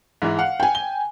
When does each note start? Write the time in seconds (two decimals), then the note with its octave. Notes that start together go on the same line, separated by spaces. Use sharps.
0.22 G#2 E3 E4
0.39 F5 F#5
0.60 G5 G#5
0.75 G7